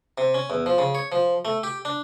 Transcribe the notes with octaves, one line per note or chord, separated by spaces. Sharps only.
C3
C#4
E2
F3
C#3
C#5
F3
A3
G4
D4